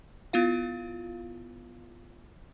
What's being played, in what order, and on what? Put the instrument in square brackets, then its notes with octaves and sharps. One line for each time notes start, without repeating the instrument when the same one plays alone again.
[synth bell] B3 E4 F4 F5